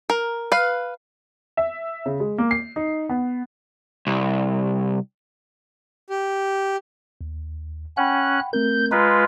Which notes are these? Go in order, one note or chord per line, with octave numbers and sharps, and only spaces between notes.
A#4
B4 F5
E5
C#3
G#3
A#3
C7
D#4
B3
C2
G4
D#2
C#4 F#5 G5 B5 F#6
A3 C4 A#4 G6
G#3 F4 B4 A#5